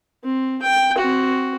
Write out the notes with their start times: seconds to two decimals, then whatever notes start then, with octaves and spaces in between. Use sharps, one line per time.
0.24 C4
0.63 G5
0.98 C4 F#4